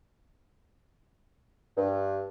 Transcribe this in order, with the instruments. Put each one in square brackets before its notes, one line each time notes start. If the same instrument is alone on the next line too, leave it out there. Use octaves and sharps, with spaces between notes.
[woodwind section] G2